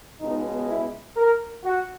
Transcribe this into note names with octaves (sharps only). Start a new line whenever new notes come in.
C#2 B2 G#3 B3 D#4
E4
A#4
F#4